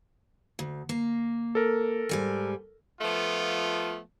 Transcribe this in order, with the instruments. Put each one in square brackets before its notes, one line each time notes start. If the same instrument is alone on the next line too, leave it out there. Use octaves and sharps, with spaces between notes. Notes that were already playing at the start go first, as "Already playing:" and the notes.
[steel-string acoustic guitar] D2
A#3
[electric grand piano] A4 A#4
[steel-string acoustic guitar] G#2 G3 G#5
[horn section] F3 A3 B3 F4